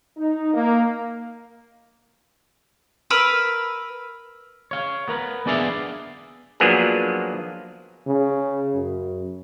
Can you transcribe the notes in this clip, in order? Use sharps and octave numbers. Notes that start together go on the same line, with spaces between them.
D#4
A#3
A#4 B4 B5 E6
C#5 F5
B3 A#4 B4
B3 D4 G#4 D5 E5 F5
F3 F#3 A#3 B3 D4 G#4
C#3
F#2